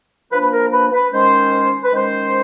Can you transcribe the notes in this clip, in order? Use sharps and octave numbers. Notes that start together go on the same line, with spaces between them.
F3 A#3 D4 B4
B4
A#4
B4
B4
D#3 G#3 C#4 C5
B4
D#3 G#3 C#4 C5